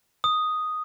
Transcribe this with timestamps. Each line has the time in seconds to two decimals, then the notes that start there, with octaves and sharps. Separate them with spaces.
0.24 D#6